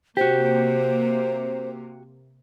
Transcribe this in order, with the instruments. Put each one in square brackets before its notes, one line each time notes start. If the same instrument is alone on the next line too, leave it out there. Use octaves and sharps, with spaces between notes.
[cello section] C3 A#3 [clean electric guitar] F#4 G4 [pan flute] C5